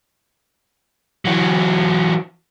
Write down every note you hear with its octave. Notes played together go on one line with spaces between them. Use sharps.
E3 F#3